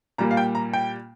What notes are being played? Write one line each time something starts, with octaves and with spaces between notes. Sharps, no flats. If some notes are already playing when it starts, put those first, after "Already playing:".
A#2 G3 A#3 A#5
F5
G5
A#5
G5